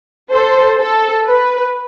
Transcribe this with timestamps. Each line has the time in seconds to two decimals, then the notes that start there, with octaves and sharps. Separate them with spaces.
0.31 A4 C5
0.80 A4
1.28 B4